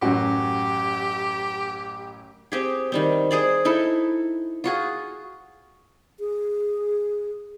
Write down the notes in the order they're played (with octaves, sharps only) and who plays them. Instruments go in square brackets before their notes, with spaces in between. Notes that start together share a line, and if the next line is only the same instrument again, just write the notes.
[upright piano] A1 F#4 [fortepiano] F#2 C#4 [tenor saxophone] G4
[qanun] C4 G4 G#4
D#3 G3 C4
G#4 C5 D5
D#4 E4 A4
F4 F#4 G#4
[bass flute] G#4